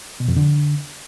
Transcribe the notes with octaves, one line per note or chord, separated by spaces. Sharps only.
B2
F2
D3